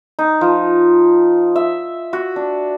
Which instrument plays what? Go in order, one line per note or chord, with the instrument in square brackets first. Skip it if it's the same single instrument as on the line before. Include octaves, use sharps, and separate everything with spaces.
[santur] D#4
F3
E5
F#4
D4